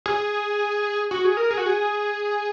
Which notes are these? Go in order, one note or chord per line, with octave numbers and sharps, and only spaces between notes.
G#4
F#4
G#4
A#4
G#4
F#4
G#4